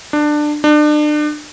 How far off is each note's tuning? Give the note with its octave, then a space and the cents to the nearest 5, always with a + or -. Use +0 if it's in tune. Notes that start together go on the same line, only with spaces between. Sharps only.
D4 +20
D4 +35